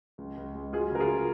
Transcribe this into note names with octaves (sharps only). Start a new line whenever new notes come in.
C#2
C#2
G#3
F#3 F4 G#4
C#3 A#4
F4 G#4